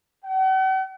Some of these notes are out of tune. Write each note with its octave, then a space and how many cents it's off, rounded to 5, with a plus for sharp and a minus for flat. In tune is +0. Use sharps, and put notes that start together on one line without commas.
F#5 +45